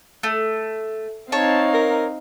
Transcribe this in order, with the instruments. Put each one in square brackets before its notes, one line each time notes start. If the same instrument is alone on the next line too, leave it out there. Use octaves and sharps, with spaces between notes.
[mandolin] A3
[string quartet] C4 D#4 F5 [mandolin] C#5 [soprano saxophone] A5
[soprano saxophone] A#4